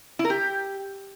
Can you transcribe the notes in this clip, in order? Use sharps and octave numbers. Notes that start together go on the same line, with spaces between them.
E4
A#4
G4